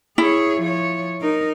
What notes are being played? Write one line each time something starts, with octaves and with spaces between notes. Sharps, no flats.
E4 G#4 C#5
F3 C#5
D#4 A#4